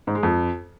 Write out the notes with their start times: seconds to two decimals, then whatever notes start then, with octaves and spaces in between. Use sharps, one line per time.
0.07 G#2
0.15 G#3
0.23 F2